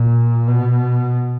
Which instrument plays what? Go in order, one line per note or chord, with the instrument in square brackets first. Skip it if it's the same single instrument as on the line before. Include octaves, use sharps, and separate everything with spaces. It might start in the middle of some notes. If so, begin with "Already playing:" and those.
Already playing: [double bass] A#2
B2